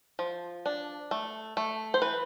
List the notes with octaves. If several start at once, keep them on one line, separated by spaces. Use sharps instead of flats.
F3
D4
A3
A3
C5
E3 B4